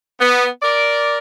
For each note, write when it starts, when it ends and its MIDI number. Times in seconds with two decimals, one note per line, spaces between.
0.20 0.47 59
0.62 1.18 70
0.62 1.18 74